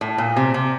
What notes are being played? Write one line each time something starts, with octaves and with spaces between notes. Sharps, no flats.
A2
A#2
C3
C3